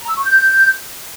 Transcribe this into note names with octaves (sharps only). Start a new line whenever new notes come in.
A#5
E6
C#6
G6